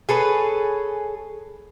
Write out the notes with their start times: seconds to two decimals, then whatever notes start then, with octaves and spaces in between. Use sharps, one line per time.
0.09 G#4 A4 B4 C#5